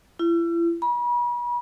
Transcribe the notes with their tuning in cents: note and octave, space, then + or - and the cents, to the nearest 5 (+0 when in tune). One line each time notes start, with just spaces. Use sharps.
E4 +40
B5 -40